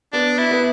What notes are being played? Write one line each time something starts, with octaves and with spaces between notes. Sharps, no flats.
B3 D4
E4
B3